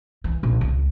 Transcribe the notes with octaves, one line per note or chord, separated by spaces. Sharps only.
E3
A#1
C#2